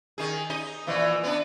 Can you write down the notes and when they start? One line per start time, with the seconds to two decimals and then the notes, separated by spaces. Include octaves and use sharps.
0.18 D#3 G#4
0.50 D#4 D#5
0.87 A#2 E3 F3
1.23 B3 D4